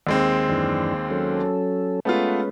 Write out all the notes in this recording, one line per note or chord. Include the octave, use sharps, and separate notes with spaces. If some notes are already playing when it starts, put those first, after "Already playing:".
D#2 G#3 C4
F#2 E3 D4
F#3 C#4 A4
G#3 A3 B3 C#4 F4 B4